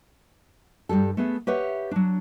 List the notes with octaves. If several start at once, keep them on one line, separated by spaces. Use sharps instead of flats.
G2 G3 G4 A4
A3 B3 G#4 A4
G4 B4 C#5 E5 F#5
F#3 D4